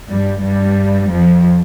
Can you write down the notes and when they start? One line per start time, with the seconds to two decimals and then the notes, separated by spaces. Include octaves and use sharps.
0.10 G2 G3
0.44 G2 G3
1.12 F2 F3